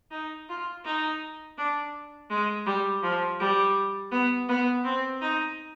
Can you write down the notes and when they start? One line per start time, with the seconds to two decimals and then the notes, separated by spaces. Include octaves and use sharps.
0.11 D#4
0.49 F4
0.85 D#4
1.58 D4
2.30 G#3
2.66 G3
3.03 F3
3.40 G3
4.11 B3
4.49 B3
4.84 C4
5.21 D#4